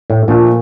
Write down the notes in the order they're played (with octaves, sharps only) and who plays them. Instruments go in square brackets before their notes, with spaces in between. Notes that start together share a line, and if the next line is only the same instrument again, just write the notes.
[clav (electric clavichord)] A2
[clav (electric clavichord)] A#2 [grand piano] F3 A3 D4